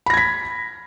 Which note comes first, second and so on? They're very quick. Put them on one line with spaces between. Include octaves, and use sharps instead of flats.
B5 A#6 G#6 B6